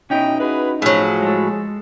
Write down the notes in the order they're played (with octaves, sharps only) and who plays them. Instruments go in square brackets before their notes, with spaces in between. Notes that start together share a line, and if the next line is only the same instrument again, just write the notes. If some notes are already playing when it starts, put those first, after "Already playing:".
[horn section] B2 G5 [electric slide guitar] C#4 D#4 E4
[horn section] F#4 G#4 B4
[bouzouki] A2 F#3 [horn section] F3 G#4
[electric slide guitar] G#3 A4